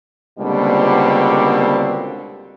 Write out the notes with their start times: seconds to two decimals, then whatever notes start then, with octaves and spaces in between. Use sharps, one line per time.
0.39 C#2 B2 D3 G3 A#3 C4